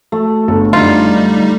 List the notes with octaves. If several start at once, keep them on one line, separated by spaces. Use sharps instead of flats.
A3
G1 A4
F#2 D3 G3 D#4 F4